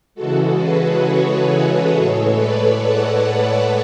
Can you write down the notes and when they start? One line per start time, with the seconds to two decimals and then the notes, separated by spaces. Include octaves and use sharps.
0.15 C#3 E3 G#3 F#4 A4
0.59 G#4 B4
1.03 A4 C#5
1.91 A2 G#3
2.34 B4 D5
2.79 D5 F#5
3.22 B4 D5